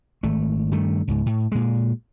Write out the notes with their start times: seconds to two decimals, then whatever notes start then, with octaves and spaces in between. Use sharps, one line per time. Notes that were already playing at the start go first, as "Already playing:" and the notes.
0.23 G#1 A3
0.72 G2 D#3 A3
1.08 C#2 G#2
1.26 A2
1.52 A#2 G#3